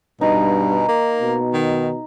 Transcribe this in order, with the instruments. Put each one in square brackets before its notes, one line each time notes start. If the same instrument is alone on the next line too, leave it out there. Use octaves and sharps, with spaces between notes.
[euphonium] G2 [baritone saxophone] B2 [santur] D#4
[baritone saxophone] A#3
[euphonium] B2
[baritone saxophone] D#3